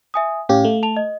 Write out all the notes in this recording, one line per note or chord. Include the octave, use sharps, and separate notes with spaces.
E5 G#5 D#6
A2 C#4 G4 F5
A3
A5 F7
D#5